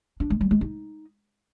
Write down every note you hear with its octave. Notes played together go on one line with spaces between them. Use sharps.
D4
G#3
G3
G#3
D#4